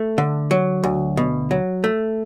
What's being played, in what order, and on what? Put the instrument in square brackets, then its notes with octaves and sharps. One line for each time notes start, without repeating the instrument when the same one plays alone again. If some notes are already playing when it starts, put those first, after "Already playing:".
Already playing: [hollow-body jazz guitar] A3
D3
F#3
D2
B2
F#3
A3